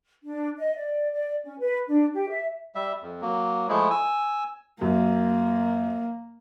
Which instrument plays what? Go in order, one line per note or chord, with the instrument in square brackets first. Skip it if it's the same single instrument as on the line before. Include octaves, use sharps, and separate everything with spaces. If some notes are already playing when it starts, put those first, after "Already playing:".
[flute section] D4
D#5
D5
D5
C#4
B4
D4
G4
E5
[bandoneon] G3 E5
F2
F#3 A#3
F3 G#3 A3 E4 G#4
G#5 E6
[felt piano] F#2 [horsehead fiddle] A#3